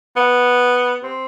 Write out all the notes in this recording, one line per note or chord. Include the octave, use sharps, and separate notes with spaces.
B3
C4